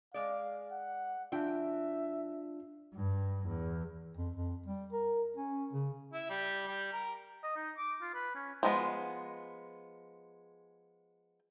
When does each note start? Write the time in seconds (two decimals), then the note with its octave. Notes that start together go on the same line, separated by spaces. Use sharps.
0.14 G#3 D5 F5
0.72 F#5
1.32 E3 D4 F4 E5 G5
2.94 G2
3.47 E2
4.17 F2
4.36 F2
4.66 G3
4.92 A#4
5.36 C#4
5.73 C#3
6.13 E4
6.29 G3
6.67 G3
6.93 A#4
7.43 D#5
7.56 D#4
7.77 D6
8.01 F4
8.14 B4
8.35 C#4
8.63 F3 G#3 B3